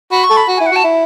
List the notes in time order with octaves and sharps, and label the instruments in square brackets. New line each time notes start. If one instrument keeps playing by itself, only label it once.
[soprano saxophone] F#4 [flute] B5
[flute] C#6
[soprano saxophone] A4
[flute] B5
[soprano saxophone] F#4
[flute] G#5
[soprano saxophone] E4
[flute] F#5
[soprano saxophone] F#4
[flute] A5
[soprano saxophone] E4